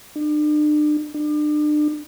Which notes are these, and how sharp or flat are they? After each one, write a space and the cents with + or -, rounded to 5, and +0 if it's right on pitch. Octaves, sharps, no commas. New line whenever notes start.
D4 +40
D4 +35